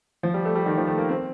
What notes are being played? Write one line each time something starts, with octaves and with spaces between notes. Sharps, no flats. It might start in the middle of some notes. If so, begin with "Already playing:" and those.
F3
G3
A3
G3
D#3
F3
A3
A#3
C4